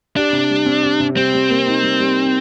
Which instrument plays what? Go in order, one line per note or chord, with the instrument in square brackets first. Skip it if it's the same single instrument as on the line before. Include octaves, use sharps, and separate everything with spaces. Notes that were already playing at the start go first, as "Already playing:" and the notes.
[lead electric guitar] D4 [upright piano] G4
[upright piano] C3
G3
C4
G4
C3
[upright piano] G3 [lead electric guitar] C4
[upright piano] G3
A#3
D#4
G3
G3